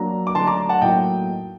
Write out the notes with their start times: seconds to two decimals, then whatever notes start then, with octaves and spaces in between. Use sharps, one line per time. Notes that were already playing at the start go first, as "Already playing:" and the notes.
Already playing: F#3 A#3 D4 A#5
0.27 D6
0.35 D3 F#3 A3 D4 A5 C6
0.47 A#5 D6
0.69 F#5 A5
0.81 A2 F#3 A#3 D#4 D#5 G5